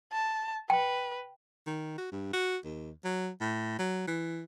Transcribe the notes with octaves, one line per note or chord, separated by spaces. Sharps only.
A5
B4 G5
D#3
F#4
G2
F#4
D#2
F#3
A2
F#3
E3